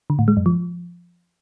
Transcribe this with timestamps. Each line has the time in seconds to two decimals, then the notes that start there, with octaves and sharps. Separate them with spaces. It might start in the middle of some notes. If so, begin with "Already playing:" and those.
0.10 D3
0.19 A2
0.28 G#3
0.37 F#2
0.46 F3